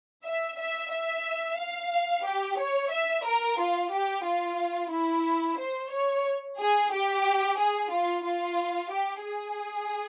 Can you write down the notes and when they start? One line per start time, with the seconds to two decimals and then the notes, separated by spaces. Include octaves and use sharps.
0.24 E5
0.58 E5
0.91 E5
1.58 F5
2.25 G4
2.58 C#5
2.91 E5
3.25 A#4
3.58 F4
3.91 G4
4.25 F4
4.91 E4
5.58 C5
5.91 C#5
6.58 G#4
6.92 G4
7.58 G#4
7.91 F4
8.25 F4
8.92 G4
9.25 G#4